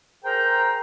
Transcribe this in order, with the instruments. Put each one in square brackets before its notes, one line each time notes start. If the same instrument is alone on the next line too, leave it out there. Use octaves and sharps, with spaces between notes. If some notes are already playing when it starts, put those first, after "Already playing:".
[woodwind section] G#4 A#4 C5 G5 A#5